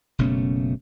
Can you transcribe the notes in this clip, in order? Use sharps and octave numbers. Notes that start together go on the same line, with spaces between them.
F#1 B2 A3 C#4